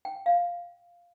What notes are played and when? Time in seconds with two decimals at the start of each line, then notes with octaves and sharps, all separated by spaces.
0.05 G5
0.26 F5